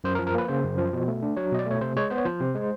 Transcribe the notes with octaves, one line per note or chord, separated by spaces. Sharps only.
F#2 C5
A#4
F3
A#4
A#3 B4
C#3 C5
F#2
F3
B2
A3
D4
F#3 C#5
B2 D#5
D5
A3 C#5
C3 C5
G#3 C#5
B3 C5
C#5
F3 C5
C3
G#3